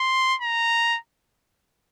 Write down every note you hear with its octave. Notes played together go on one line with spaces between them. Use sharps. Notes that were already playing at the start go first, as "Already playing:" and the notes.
Already playing: C6
A#5